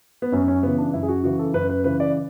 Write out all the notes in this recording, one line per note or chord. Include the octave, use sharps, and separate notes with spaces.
B3
F#2 C#4
C#4
C#3 E3 B3
D4
F#2 E4
G#4
F#4
C#3 E3 F#4
A4
F#2 B4
B4
C#3 E3 B4
D5